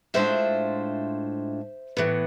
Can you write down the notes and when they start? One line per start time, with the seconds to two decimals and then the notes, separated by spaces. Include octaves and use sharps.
0.14 A2 G#3 D4 F4 C5 E5
1.97 A2 E3 B3